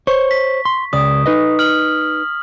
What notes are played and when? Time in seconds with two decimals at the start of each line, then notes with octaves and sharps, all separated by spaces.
0.07 C5 C#5 C#6
0.31 B6
0.65 C6
0.93 C#2 D5 D#6
1.26 D#4 B4 D#5
1.59 F6 F#7